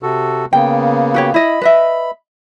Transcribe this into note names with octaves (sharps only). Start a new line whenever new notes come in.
C3 F#4 A4
C#3 A#3 B3 G5
F#4 G4 C#5
E4 D#5 B5
B4 D#5 E5